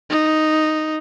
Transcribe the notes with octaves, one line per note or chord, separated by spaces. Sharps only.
D#4